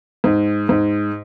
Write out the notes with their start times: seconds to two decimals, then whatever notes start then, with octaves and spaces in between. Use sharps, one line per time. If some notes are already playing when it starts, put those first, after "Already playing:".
0.24 G#2
0.69 G#2